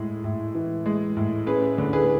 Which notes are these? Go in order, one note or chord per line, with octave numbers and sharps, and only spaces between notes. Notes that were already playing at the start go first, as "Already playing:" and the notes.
Already playing: A2 G#3
A2
E3
G#3
A2
C#4 G#4 B4
D3
G#4 B4